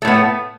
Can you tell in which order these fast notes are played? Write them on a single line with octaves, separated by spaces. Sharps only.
A3 A2 B3